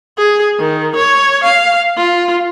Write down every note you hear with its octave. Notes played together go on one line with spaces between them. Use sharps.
G#4
D#3
C#5
F5
F4